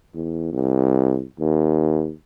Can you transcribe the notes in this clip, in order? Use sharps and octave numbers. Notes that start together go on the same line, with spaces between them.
E2
C2
D#2